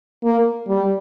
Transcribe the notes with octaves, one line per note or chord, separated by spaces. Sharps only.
A#3
G3